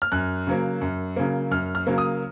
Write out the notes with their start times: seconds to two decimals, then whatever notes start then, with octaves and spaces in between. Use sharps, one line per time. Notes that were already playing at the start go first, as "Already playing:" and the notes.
0.02 F6
0.12 F#2 F#6
0.47 C#3 F#3 A#3
0.81 F#2
1.16 C#3 F#3 A#3
1.51 F#2 F6
1.75 F6
1.87 C#3 F#3 A#3
1.98 D#6